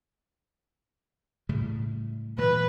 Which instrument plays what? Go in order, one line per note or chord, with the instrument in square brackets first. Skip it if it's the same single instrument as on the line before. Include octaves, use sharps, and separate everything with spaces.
[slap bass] A2 C#3 G3
[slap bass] A#2 E3 F#3 [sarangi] B4